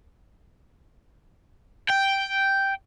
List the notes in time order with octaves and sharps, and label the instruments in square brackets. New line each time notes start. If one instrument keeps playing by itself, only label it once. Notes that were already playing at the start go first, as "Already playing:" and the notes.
[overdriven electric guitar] G5